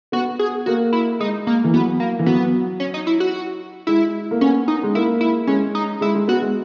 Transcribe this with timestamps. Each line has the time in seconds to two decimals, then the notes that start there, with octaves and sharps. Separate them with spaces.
0.12 B3 F#4
0.39 G#4
0.66 A#3 F#4
0.93 E4
1.20 G#3 D#4
1.47 A#3
1.64 E3
1.74 F#3 B3
2.00 A#3
2.19 E3
2.26 F#3 B3
2.80 C#4
2.94 D#4
3.07 E4
3.20 F#4
3.87 G#3 E4
4.31 A#3
4.41 B3 C#4
4.68 D#4
4.83 G#3
4.95 A#3 E4
5.21 E4
5.47 G#3 C#4
5.75 D#4
6.01 G#3 E4
6.15 G#3
6.28 B3 F#4
6.42 G#3